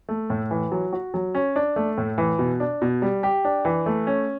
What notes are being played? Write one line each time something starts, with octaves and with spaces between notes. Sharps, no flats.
A3
A2
E3
F#3
F#4
F#3
C#4
D4
A3
A2
E3
B2
D4
B2
G3
G4
D4
E3
A3
C#4